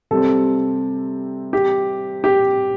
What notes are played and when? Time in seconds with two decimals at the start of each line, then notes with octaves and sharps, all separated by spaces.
0.11 C3 G3 C4 A4
1.53 G4
2.24 G4